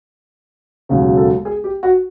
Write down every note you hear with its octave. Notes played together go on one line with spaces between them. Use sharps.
E1 D#2 C#3 F#3
A4
G#4
G4
F#4